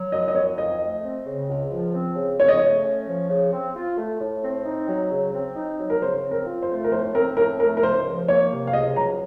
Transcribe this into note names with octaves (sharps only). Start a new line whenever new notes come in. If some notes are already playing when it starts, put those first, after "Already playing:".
Already playing: F#3
F#2 D#5
D#5
D#3 C#5
F2 D#5
A3
C4
C#3
C#2
F3
C4
C#3
C#3 C#5
D#5
A3 C#5
C#4
F3
C#3
C4
F4
A3
A2
C4
D#4
F#3
C#3
C4
D#4
F#3
A#4
C#3 C5
C4
A#4
F4
C5
A3
A#4
A2 C5
C4 A#4
A2 A#4
A3 A#4
A#4
C#2 C5
F3
A#3 C#5
C3
F5
C#2 D#5
F#3 A#5